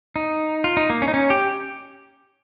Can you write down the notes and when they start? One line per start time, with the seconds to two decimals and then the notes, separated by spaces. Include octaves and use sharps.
0.16 D#4
0.64 F4
0.77 D#4
0.90 A#3
1.02 C#4
1.08 D#4
1.14 C#4
1.30 G4